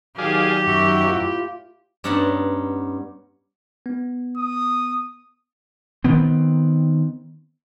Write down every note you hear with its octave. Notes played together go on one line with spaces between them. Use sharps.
D#3 F#3 G4 G#4 D5 F5
F#2 F#4 E5 F#5
A2 E4 F4
G2 B3 C#4 D#4 F#5 A5
B3
D#6
D#3 B3 C4